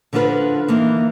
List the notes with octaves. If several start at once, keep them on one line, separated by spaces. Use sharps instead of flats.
D3 F3 D4 F4 B4
E3 A#3 D#4